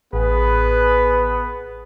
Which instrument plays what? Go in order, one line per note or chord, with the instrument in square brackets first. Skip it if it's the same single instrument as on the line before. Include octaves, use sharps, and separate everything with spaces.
[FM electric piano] A1 [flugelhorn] B3 [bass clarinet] G#4 [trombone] B4